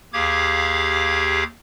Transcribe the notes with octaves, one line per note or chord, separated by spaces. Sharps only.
D#2 G4 G#4 F5 D6 G#6